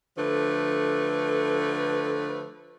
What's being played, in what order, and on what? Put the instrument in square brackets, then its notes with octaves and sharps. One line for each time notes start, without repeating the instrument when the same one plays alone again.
[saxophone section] D3 F3 A3 B4